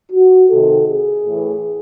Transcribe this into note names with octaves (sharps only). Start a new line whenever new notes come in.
F#4
C3 D#3 A4
G#4
A2 E3